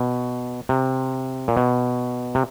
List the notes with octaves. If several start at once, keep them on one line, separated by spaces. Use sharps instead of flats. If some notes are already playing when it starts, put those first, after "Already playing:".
Already playing: B2
C3
A#2
B2
C3